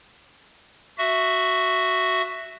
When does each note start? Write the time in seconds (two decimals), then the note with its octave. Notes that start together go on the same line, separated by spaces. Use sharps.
0.98 F#4 E5